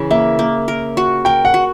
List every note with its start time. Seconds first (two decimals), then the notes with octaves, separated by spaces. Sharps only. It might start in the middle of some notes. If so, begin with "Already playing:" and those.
Already playing: C#3 E3
0.11 A#3 E5
0.39 A#3
0.68 A#4
0.97 F#4
1.25 A#4 G5
1.45 F#5
1.54 F#4